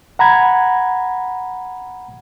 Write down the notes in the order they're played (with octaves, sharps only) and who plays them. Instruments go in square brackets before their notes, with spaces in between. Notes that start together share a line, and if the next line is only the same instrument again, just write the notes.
[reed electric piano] F#5 A#5 B5 G#6